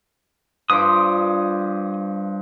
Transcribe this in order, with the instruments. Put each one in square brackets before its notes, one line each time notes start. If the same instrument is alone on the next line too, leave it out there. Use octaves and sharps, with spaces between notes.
[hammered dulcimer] G2 F3 D6 [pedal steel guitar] D#6